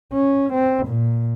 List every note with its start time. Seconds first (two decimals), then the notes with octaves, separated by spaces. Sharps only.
0.13 C#4
0.53 C4
0.87 A#2